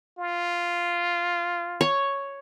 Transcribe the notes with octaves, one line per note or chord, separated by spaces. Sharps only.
F4
C#5